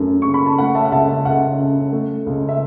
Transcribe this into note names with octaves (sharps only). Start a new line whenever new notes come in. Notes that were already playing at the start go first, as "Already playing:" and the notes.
Already playing: F#2 A3
C#3 C#6
B5
A5
A3 F#5
E5 A5
F#5
C#2 E5 A5
E5
C#2 F#5
C#3
A3
C#2
E5